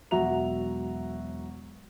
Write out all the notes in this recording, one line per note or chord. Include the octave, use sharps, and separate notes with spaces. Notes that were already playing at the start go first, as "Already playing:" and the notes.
E1 F#3 F#4 E5 A#5 F7